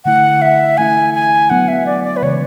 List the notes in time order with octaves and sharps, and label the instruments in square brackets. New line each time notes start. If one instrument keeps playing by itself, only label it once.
[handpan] D3 A3 E4 [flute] F#5
[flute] E5
[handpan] E3 A3 C#4 E4 [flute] G#5
[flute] G#5
[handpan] F#3 B3 D4 [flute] F#5
[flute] E5
D5
D5
B4
[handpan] C#3 E3 G#3 [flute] C#5